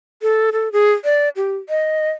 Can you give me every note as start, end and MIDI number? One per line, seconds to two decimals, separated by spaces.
0.22 0.50 69
0.52 0.71 69
0.72 0.92 68
1.04 1.29 74
1.36 1.57 67
1.69 2.11 75